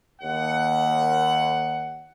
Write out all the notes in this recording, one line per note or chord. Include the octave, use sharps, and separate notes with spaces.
D#2 F#5